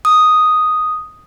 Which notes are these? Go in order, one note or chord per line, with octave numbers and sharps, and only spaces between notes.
D#6